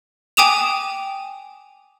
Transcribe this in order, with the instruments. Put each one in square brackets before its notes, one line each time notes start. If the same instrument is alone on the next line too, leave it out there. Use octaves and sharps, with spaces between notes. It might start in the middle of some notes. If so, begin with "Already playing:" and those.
[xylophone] G5 G#5 D6 D#6 E7 F7